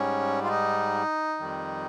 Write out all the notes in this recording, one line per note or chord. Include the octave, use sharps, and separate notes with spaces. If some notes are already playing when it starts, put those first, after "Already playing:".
Already playing: G#2 G3 C#4
F4
D#4
F2 D#3 G3